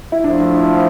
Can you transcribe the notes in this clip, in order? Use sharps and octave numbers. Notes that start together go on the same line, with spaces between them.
E4
F3 A3 D4 E4